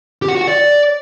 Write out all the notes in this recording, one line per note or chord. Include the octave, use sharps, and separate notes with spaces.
G4
F#5
F#4
F#5
D5